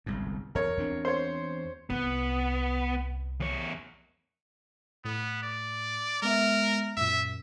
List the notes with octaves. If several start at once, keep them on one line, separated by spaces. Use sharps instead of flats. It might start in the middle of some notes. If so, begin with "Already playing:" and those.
G1 C2 G#2
E2 A#4 C#5
E2 C4 D4
C5 C#5
C2 B3
E2 C#5
A2 B3
D5
G#3 B3 A#4 E5
F#2 A#2 E5